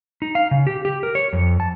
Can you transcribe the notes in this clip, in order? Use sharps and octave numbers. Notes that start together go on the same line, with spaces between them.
D#4
F5
C#3
G4
G4
A#4
C#5
F2
A5